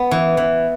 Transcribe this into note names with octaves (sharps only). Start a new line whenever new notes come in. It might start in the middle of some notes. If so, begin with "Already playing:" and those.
Already playing: B3
E3
E3